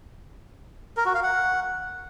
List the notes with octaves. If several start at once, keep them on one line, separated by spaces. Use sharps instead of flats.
A#4
F#4
F5
F#5